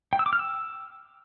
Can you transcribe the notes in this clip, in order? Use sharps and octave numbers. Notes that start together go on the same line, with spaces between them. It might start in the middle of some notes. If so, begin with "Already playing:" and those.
G5
E6
D6
F6
E6